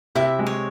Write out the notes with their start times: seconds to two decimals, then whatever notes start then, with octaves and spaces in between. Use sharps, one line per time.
0.15 C3 E4 E5
0.39 G#3
0.47 C#5